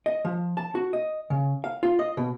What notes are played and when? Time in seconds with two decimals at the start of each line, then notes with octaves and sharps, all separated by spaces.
0.06 D#5
0.25 F3
0.57 A5
0.75 F#4
0.93 D#5
1.30 C#3
1.64 F5
1.83 F4
1.99 D#5
2.17 B2